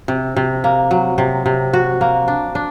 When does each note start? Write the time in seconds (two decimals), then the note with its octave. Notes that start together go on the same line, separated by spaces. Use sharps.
0.08 C3
0.36 C3
0.64 A#3
0.91 F#3
1.18 C3
1.46 C3
1.73 F#4
2.01 A#3
2.28 D4
2.55 D4